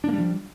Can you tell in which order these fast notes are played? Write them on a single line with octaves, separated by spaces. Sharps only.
D4 A#3 G3 F3